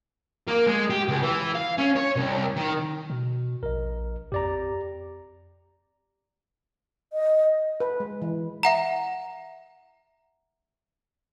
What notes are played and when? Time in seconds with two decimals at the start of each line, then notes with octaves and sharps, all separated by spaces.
0.48 A#3
0.67 G#3
0.90 G4
1.09 C#2
1.23 E3
1.55 F5
1.78 C#4
1.96 C#5
2.16 C2
2.57 D#3
3.10 B2
3.63 A#1 A#4 D#5
4.32 F2 G4 D5 A#5
7.13 D#5
7.80 B4
8.00 G#3
8.22 E3
8.63 E5 F#5 A#5